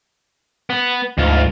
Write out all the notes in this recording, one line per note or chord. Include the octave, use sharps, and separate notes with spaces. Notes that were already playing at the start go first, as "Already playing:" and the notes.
B3
D2 G#2 F4